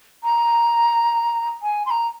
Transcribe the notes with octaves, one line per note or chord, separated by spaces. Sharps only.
A#5
G#5
C6
A#5